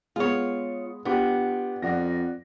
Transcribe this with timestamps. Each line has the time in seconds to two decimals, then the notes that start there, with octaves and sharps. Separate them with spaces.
0.16 G#3 B3 F4 C#5
1.05 B3 D4 F4 G4
1.82 F2 D5 F#5 A#6